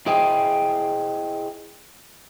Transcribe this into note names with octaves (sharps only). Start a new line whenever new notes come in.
E4 G#4 C5 D#5 G5